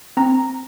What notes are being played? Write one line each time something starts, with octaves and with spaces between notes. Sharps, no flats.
C4 A#5